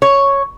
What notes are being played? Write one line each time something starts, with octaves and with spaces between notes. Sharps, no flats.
C#5